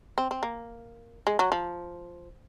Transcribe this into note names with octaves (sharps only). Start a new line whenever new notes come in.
C4
C4
A#3
G#3
F#3
F3